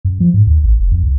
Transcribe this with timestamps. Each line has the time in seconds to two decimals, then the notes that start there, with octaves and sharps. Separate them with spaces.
0.05 F#2
0.20 F3
0.34 G#2
0.47 D#2
0.64 A1
0.80 F1
0.92 F2
1.03 C2